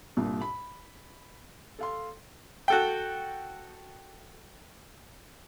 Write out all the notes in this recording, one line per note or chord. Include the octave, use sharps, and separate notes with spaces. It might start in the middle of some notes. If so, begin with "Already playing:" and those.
C2 G2 A#2
B5
A4 F5 C6
F#4 A4 G5